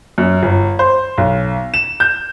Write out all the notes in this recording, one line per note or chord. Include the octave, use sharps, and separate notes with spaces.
F#2
G1
C5
B1
E7
G6